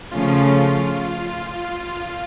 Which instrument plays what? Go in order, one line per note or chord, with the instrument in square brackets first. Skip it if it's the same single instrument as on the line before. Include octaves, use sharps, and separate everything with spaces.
[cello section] C#3 F3 A3 C#4 [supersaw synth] F4